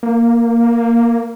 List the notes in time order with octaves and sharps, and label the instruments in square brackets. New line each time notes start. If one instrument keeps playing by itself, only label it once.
[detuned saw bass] A#3